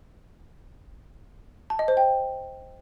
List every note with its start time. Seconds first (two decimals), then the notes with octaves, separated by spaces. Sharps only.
1.70 A5
1.79 D#5
1.88 C5
1.97 G5